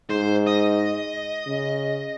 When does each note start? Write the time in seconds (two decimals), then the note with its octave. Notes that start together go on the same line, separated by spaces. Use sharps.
0.10 G#2 C5
0.47 D#5
1.47 C#3